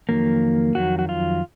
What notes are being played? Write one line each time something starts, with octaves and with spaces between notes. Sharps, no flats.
F2 D#3 F#3 A#3
F2 D#3 F#3 F#4
F#4
F4